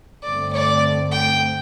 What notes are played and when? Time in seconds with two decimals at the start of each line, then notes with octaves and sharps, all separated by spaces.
0.23 G2 D3 A3 C4 D5
0.53 D5
1.12 G5